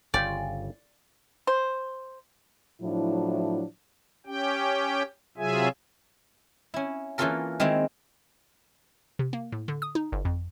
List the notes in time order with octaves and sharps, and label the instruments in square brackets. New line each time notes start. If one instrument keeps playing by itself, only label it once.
[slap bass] G1 C#3 [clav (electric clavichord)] C#4 F4 G5 [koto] D5
[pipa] C5
[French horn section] A2 F3 F#3 D4 E4
[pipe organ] C#4 G4 G5
C3 F#3 F4 G#4 E5 G#5
[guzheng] C#4 E4
E3 A#3 C#4 F4 A4 A#4
D#3 G#3 C4 E4
[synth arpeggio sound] C3
A#3
A2
D3
D#6
D#4
G1
F2